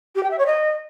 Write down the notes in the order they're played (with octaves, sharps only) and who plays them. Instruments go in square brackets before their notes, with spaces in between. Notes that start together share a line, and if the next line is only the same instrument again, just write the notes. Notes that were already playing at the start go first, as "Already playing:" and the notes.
[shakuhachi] G4
G5
E5
C#5
D#5